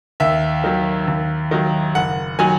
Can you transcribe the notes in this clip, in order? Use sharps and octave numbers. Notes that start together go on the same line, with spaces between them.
D#2 E5
D#3 F#3
D#2
D#3 F#3
F#1 F#5
D#3 F#3 G#5